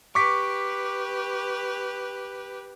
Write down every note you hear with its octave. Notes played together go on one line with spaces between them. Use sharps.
G4 B4 C#6 D6 B6